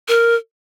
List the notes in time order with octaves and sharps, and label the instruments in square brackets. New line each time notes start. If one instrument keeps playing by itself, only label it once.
[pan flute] A#4